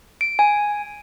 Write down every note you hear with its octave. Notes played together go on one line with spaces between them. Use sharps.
D7
G#5